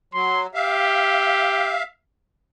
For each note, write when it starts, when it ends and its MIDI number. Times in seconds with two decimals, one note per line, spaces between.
0.14 0.47 54
0.14 0.42 84
0.54 1.82 67
0.54 1.83 76
0.54 1.83 77